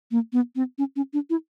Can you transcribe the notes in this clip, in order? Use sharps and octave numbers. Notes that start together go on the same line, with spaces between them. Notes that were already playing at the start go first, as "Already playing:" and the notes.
A#3
B3
C4
C#4
C#4
D4
E4